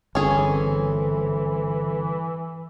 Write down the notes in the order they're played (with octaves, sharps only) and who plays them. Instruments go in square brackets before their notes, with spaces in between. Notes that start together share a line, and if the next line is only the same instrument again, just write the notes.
[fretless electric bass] G1 [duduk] E3 [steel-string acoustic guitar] C4 A4 [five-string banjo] C#4 G#4